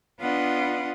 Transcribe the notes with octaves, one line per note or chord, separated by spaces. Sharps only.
B3 D4 F4 B4 D#5 F#5